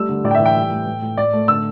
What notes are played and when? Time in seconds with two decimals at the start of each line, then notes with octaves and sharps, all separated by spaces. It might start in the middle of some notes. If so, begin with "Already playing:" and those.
Already playing: G3 A3 E6
0.09 D3
0.24 A2 D5
0.31 G5
0.35 E5
0.40 E3
0.45 G5
0.55 G3
0.71 A2
0.87 A2
1.02 A2
1.17 A2 D5
1.33 A3
1.48 D3 E6